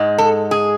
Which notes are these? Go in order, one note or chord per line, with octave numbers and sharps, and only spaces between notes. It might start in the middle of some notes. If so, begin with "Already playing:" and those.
Already playing: G#2 G#3
A4
G#4